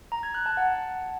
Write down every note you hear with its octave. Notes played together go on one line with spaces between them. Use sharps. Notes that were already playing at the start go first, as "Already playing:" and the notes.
A#5
G#6
F#6
A5
F#5